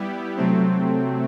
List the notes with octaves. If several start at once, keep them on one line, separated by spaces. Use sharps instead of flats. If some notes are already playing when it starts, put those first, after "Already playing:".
Already playing: G3 B3 E4 G4
C3 F#3 A3 C4